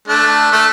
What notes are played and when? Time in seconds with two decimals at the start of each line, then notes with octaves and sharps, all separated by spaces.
0.08 A3 D4
0.52 A3